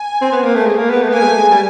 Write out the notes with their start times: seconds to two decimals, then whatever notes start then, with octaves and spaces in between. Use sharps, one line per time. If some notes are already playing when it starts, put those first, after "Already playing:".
Already playing: G#5
0.21 C4
0.32 B3
0.43 A#3
0.55 A3
0.66 G#3
0.78 A#3
0.90 B3
1.02 A3
1.09 B3
1.14 A#3 G#5
1.21 G#3
1.26 A3
1.38 G#3
1.51 G3